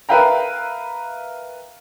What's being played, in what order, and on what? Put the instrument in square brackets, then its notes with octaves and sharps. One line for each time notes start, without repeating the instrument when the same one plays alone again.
[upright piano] A#4 B4 E5 F5 G5 A#5